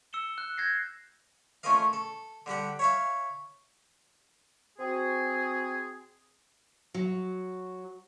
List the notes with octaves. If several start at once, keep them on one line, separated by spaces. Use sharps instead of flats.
E6 C#7 E7 G7
F#6
G6 G#6 A#6 C7
A3 C#4 F4 A#4 D#5 F5
A4
D3 G3 G4 F#5
C#5 E5 F5
C4 F#4 G#4
F#3